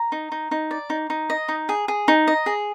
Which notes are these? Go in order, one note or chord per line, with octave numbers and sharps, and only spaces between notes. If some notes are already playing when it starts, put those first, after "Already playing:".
Already playing: A#5
D#4
D#4
D#4
D5
D#4
D#4
D#5
D#4
G#4
G#4
D#4
D#5
G#4